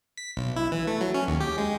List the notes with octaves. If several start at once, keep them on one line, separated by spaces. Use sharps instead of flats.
B6
B1
E4
E3
A3
F#3
C#4
D#2
G4
G#3